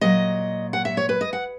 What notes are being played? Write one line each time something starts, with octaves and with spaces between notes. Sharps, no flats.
A#2 F#3 D#5
F#5
E5
C#5
B4
D#5
F#5